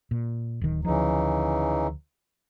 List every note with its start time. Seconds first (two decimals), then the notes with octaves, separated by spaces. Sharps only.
0.11 A#2
0.61 D1 D#3
0.85 D2 C#3 E3 F3 D#4